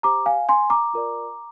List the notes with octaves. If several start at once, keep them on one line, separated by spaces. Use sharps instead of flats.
G4 C5 A#5 D6
F5 G#5
G#5 C6
A#5 D6
F4 A#4 D5